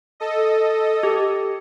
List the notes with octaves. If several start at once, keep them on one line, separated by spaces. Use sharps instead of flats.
A4 D#5
G4